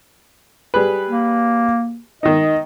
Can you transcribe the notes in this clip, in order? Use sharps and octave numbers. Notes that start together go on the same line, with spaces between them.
G3 G#4 B4
A#3
D#3 D#4 D#5